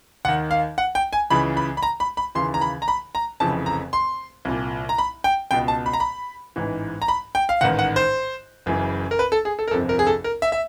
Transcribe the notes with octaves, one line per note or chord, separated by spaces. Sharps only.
D#2 D#3 F#5
F5
F#5
G5
G#5
C#2 C#3 E3 B5
B5
B5
A#5
B5
B5
D#2 C#3 E3 C6
A#5
B5
A#5
B5
A#5
F1 F2 C#3 E3 A5
A#5
C6
C2 A#2
A#5
B5
G5
C#2 B2 G5
A5
B5
A#5
B5
A1 G#2 E3
A#5
B5
G5
F5
A1 G#2 D#3 F#5
F#5
C5
F#1 F#2 C#3 E3
A#4
B4
A4
G#4
A4
A#4
G1 F2 C3 A4
A#4
G#4
A4
A#4
E5
E5